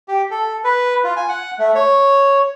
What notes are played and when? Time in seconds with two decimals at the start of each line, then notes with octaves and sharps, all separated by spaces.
0.08 G4
0.31 A4
0.64 B4
1.04 F4
1.16 G#5
1.29 F#5
1.59 A3
1.75 C#5